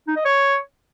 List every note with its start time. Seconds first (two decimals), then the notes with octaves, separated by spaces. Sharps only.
0.08 D#4
0.16 D#5
0.25 C#5